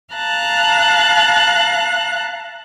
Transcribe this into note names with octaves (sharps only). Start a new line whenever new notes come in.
F5 A5 A#5 F#6